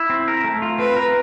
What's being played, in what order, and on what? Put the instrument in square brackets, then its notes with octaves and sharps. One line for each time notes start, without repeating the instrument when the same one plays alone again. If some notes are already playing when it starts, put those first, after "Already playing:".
Already playing: [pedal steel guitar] E4
C4
A#4
A3
F4
[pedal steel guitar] C4 [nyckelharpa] B4
[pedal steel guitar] A#4